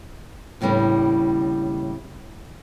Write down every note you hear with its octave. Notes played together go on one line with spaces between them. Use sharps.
D#2 A2 C#3 G3 B3 D4